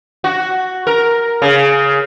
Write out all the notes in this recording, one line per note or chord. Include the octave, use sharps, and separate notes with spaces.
F#4
A#4
C#3